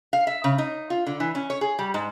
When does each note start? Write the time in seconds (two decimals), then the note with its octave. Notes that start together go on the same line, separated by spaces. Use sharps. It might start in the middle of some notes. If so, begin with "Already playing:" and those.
0.13 F5
0.27 E5
0.44 C#3
0.58 D#4
0.90 F4
1.06 D3
1.20 E3
1.35 C#4
1.50 C#5
1.61 G#4
1.79 G3
1.94 G#2